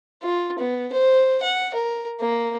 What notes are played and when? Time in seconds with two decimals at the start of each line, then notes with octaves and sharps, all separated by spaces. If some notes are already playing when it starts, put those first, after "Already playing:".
0.22 F4
0.59 B3
0.92 C5
1.42 F#5
1.74 A#4
2.20 A#3